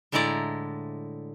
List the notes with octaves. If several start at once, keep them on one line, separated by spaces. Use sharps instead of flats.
A2 D3 G#3 E4 D5 A#5